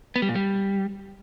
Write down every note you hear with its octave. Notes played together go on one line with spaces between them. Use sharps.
B3
G3
A#2
G3